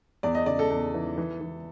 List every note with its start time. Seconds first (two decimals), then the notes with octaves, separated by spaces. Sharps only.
0.23 E2 D5
0.35 D#5
0.46 C#3 D5
0.59 A4
0.70 E2
0.94 E3
1.18 E3
1.41 E3